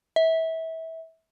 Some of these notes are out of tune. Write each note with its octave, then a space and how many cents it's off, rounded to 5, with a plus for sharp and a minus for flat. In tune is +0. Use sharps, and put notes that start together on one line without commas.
E5 -25